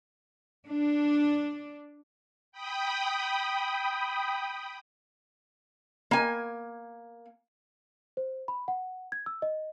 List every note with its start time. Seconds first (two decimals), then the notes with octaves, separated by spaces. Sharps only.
0.66 D4
2.52 G5 B5 D#6
6.11 A#3 G#5
8.17 C5
8.48 B5
8.68 F#5
9.12 G#6
9.26 E6
9.42 D#5